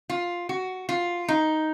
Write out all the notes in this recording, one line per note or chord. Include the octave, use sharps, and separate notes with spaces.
F4
F#4
F4
D#4